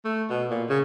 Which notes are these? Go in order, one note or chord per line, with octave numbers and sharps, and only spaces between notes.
A3
B2
A#2
C#3